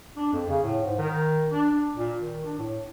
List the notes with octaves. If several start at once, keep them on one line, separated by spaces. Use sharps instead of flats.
D4
F2
C#3
A2
G#2
D#3
D4
A#2
D#3
D4
A2